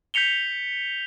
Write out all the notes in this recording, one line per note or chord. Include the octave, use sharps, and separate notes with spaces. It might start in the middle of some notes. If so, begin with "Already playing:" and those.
G6 B6 C#7 F7 G7